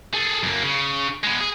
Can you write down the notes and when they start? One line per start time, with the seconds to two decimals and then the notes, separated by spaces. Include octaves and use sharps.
0.13 G#4 A4
0.43 F#2 A#3
0.63 C#3
1.23 G#3 B3
1.41 G#4